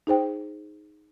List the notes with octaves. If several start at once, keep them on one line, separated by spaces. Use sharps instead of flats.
D#4 G#4 C5 G5